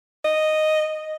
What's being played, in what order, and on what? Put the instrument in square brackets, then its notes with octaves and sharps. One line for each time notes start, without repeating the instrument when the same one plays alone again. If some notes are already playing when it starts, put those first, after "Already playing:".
[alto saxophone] D#5